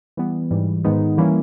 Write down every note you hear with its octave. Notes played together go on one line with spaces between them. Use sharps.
E3 G3 B3
G#2 E3 G3
G#2 D#3 G#3 B3 D#4
E3 G3 A#3 C#4 E4